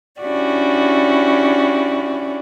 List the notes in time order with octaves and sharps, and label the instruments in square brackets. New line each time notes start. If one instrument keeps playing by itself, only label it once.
[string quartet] C#4 D4 E4 F#4 G4 D5